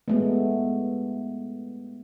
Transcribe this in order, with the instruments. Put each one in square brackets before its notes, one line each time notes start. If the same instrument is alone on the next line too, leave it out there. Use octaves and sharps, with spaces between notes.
[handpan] G#3 A3 B3